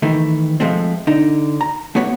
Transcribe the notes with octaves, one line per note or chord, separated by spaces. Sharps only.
D#3 E3 A3
F3 G#3 A3 C4
D3 D#4
A#5
A3 B3 F#4 C#5